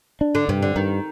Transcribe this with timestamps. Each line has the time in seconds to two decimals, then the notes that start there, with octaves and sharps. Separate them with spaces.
0.21 D4
0.35 D3
0.49 G2 C3
0.62 D3
0.76 G2 D#3